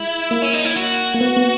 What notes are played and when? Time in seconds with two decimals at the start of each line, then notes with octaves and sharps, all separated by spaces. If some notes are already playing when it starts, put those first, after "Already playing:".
Already playing: G#3 E4
0.31 A#3
0.42 C#4
0.54 D#4
0.65 E4
0.76 F#4
1.14 A#3
1.21 B3
1.36 B3